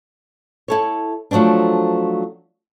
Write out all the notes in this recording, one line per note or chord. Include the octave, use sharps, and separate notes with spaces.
E4 A4 C#5
F3 F#3 A3 C4 D4